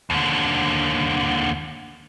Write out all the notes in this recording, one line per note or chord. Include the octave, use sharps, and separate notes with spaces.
D#2 D3